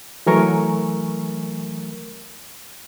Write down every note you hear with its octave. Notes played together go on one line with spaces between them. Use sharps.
E3 F#3 A3 A#4 G#5 C#6